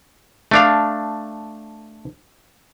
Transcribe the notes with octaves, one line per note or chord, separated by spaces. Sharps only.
A3 D4 F5